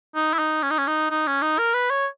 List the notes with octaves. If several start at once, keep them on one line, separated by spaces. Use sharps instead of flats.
D#4
E4
D#4
C#4
D#4
C#4
D#4
D#4
C#4
D#4
A#4
B4
C#5